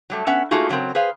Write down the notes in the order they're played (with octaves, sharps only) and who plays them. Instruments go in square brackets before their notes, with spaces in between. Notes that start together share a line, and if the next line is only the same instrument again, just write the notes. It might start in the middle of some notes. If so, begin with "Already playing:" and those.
[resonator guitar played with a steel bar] F#3 G3 A3
B3 C#4 E5 F#5
A3 A#3 D#4 F4 F#4 G#4
C#3 F#3 A#3 C4 A#4
G#4 B4 C5 F5